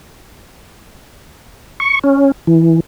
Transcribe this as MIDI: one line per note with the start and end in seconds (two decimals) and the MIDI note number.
1.80 1.99 85
2.04 2.32 61
2.47 2.80 52